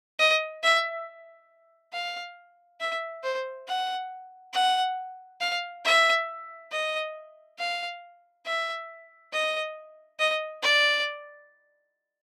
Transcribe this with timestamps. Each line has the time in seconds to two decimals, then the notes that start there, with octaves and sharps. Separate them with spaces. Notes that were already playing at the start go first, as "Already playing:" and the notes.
0.19 D#5
0.63 E5
1.93 F5
2.81 E5
3.24 C5
3.67 F#5
4.54 F#5
5.41 F5
5.85 E5
6.72 D#5
7.59 F5
8.45 E5
9.32 D#5
10.20 D#5
10.62 D5